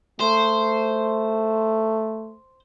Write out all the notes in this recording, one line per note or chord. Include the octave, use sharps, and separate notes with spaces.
A3 C5